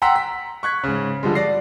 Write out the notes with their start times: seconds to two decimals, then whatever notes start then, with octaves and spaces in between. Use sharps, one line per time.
0.02 F#5 G5 A#5 C6 E6 B6
0.15 B6
0.63 C#6 F#6 G#6 B6
0.84 G#2 C#3
1.23 D3 F3 G3 G#3
1.35 D5 A#6 C7